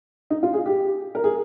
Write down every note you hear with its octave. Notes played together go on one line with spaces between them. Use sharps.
D#4
F4
G#4
G4
A#4
G#4